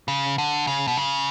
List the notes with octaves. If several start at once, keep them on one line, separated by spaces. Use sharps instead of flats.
C#3
D3
C#3
B2
C#3